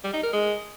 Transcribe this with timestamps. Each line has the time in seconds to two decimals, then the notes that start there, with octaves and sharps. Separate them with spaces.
0.04 G3
0.14 D#4
0.23 A#4
0.33 G#3